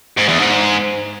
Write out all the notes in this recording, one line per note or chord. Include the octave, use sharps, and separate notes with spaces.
G#2
E2
G#2